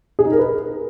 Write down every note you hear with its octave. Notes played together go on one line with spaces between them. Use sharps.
G#4
D#4
A#4
B4